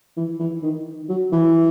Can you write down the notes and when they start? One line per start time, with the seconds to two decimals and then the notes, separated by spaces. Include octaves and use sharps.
0.17 E3
0.40 E3
0.63 D#3
1.09 F#3
1.32 E3